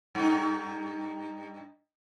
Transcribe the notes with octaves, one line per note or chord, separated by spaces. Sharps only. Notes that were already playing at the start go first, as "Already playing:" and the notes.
G2 D#4